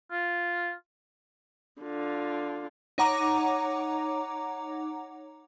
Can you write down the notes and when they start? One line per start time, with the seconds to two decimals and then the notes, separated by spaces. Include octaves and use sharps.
0.11 F4
1.82 D3 F4
2.98 D#4 C#5 F#5 A#5 D6